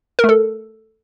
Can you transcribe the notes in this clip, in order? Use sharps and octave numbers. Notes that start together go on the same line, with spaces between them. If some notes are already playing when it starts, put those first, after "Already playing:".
A#4
A3
A4